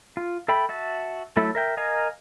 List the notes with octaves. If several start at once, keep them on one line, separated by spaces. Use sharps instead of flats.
F4
A4 E5 G5 B5
F#4 E5 A5
F#3 A3 E4 A4 E5
A#4 E5 G5
A#4 D#5 F5 G#5 A#5